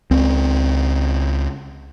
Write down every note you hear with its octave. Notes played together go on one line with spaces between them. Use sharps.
C#2 C4